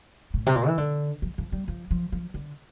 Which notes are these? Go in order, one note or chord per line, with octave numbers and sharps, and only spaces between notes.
A2
C3
A#2
E3
D3
F3
F3
G3
F3
F3
F3
D3